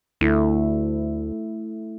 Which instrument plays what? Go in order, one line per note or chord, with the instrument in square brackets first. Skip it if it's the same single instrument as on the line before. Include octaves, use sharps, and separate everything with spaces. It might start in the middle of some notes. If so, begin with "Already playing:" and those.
[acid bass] D2 [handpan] A3 E4